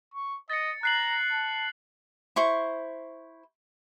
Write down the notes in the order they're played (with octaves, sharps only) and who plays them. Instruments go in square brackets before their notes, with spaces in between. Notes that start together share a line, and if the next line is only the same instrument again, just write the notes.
[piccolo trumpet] C#6
[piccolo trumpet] D#5 [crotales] A6 C#7
[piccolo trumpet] A#5 [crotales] F#6 C7 F#7
[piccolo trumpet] A5
[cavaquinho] E4 C5 C#6